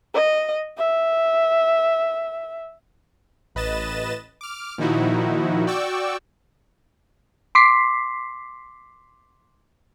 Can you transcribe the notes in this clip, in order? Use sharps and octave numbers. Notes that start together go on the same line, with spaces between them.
D#5
E5
A1 B4 D#5 A6 E7
D6 F6
A#2 D#3 F3 D#4 E4 F#4
F#4 D5 G5 C#6 D6 E6
C6 D6 B6 C7